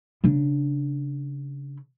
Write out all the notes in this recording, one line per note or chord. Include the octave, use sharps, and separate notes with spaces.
C#3 D4